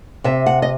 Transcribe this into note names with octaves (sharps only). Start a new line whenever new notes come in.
C3 E5
F#5
D#5